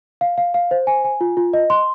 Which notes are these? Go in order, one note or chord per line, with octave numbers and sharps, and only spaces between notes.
F5
F5
F5
C5
G#5
G#5
F4
F4
D#5
C6